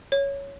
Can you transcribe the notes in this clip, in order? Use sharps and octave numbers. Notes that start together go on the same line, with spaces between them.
C#5